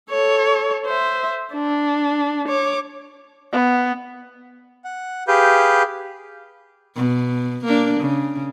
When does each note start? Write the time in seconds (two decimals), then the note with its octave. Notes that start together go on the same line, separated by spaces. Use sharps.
0.10 A4 C#5
0.86 C5 E5
1.53 D4
2.48 C#5 D6
3.53 B3
4.84 F#5
5.28 G4 G#4 B4 F5 G6
6.96 B2
7.65 A#3 D4
8.00 C#3